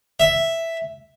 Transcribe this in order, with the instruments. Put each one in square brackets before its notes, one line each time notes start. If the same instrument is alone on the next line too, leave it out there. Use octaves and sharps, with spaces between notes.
[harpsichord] E5